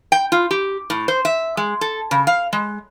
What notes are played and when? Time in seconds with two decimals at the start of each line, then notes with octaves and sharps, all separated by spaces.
0.12 G5
0.32 F4
0.51 G4
0.90 A2
1.08 C5
1.25 E5
1.57 G#3
1.81 A4
2.11 C#3
2.27 F5
2.53 G#3